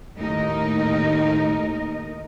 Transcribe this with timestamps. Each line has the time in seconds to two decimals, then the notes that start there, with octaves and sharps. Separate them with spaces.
0.18 D#2 A2 D#4 A#4 D#5